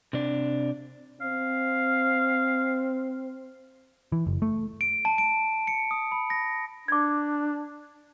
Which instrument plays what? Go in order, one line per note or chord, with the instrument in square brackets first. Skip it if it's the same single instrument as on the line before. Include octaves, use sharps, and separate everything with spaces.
[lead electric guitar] C3 D4
[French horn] C4 [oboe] F5
[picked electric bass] E3
F#1
A3
[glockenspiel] D7
A5
D7
C#7
D#6
B5
A#6
[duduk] D4 [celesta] D6 G#6